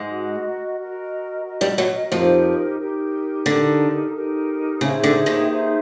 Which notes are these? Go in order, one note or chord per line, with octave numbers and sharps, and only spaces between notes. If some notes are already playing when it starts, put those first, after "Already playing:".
Already playing: G#2 G#3
F#4 A#4 D#5
F#4 A#4 D#5
F#4 A#4 D#5
G2 G3
F#2 F#3
F2 F3 D#4 G4 A#4
D#4 G4 A#4
D3 D#4 G4 A#4
D#4 G4 A#4
C#3 D#4 G#4 C5 E5
D3
D#2 D#3
D#4 G#4 C5 E5